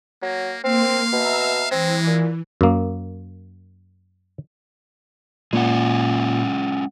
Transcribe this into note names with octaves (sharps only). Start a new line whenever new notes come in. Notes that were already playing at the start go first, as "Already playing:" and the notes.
F#3 A#3
A#3 C4 F5 C6
B2 E5 A#5 E6
E3 G#3 C4
A#2
F#2 A#3
A#2 G#3 C#4 F#5